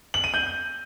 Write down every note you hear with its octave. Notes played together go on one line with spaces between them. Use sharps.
F#7
D#7
G6